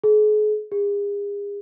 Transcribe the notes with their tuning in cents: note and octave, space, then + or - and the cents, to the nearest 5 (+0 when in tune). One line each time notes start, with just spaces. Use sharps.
G#4 +40
G#4 -40